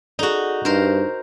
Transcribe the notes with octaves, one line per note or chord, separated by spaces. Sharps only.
D#4 F#4 G#4 A4 D5
G2 D4 D#4 A#4 C5